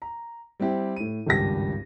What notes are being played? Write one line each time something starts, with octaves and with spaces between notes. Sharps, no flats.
A#5
G3 C4 E4 G4 G5
A2 D#7
G#1 C#2 G2 G4 A#6